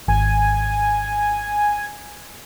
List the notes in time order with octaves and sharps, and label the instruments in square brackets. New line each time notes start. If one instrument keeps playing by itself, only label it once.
[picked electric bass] G#1 [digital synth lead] G#5